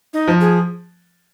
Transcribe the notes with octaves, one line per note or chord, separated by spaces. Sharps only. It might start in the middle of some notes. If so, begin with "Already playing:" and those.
D#4
F3
G#4